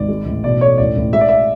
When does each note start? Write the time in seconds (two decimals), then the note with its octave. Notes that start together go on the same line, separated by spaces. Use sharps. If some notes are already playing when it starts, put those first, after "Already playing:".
Already playing: G#1 D5
0.09 G#3
0.25 A1
0.44 B2 D5
0.60 A3 C#5
0.78 A1 D5
0.96 A1
1.13 G#3 E5
1.21 D5
1.29 E5